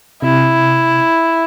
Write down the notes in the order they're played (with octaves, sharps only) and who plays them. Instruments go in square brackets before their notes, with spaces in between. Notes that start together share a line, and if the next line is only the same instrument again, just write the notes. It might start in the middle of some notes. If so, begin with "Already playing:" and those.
[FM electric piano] C3 [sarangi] E4